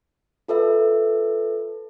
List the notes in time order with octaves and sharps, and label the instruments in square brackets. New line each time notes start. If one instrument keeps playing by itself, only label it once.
[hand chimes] F4 A4 B4 E5